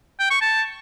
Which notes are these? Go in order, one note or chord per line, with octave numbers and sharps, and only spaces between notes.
G5
C#6
A5